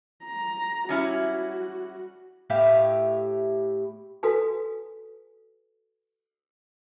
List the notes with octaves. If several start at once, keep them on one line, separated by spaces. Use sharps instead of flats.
A#5
G3 C#4 E4 F#4
A2 G4 E5 F5
F#4 A4 B4 F5 G#5